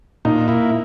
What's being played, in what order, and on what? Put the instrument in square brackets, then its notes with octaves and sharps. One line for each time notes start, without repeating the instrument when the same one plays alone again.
[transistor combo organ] A#2 [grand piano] D#4
[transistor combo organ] A#3 E4